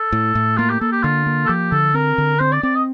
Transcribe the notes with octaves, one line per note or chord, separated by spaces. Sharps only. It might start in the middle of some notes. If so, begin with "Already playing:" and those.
Already playing: A4
A2
A2
A#3 F4
G4
A#3 A4
G4
D3 F4
A#3
A4
F3 G4
D3 A4
C4 A#4
D3
C4 C5
D5
C4 D5
D#5